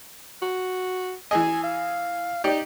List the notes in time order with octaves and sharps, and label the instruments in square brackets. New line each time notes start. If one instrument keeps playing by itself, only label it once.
[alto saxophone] F#4
[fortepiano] E3 G#4 D#5 [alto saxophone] G#5
[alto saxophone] F5
[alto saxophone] D#4 [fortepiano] G4 D5